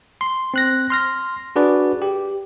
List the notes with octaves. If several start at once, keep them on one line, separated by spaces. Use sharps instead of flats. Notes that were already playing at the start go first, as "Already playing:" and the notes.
C6
C4 F#6 A#6
C6 F6 A#6
D4 F#4 G#4 B4 D5
G4